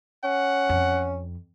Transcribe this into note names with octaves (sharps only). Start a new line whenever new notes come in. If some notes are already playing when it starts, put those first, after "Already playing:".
C#4 F#5
F2